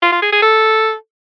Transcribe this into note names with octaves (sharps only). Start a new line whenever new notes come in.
F4
F4
G#4
G#4
A4